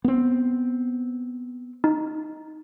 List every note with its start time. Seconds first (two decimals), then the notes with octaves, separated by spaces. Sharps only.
0.04 B3 C4
1.84 D#4